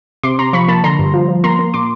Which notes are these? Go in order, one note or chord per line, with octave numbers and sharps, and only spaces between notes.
C3 C6 D6
C3 A#5 C6
F3 B5 C#6
A#3 A5 B5
D3 A#5 C6
G2
F3
F3
A#3 A#5 C6
A#3
A#2 C6 D6